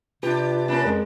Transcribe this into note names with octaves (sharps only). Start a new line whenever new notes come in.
C3 D4 F4 G4 B4
A#3 C#4 D4
F2 G#3 A#4